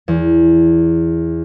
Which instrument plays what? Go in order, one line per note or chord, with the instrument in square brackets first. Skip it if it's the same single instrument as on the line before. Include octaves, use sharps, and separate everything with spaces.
[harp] E2